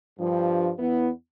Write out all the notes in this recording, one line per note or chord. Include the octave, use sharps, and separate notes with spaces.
G2 F3
E2 B3 E4